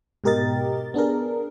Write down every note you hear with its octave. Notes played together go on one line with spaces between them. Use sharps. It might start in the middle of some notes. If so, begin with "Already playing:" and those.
G#2 B2 G4 A#4 D#5 A6
B3 D4 G#4 A#4